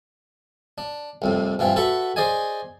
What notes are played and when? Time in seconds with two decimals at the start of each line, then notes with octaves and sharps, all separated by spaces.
0.78 D4
1.22 C2 F2 A2
1.59 G2 E3 F3 C4
1.76 F#4 A4 B4 E5 F#5
2.16 G#4 C5 D5 D#5 G#5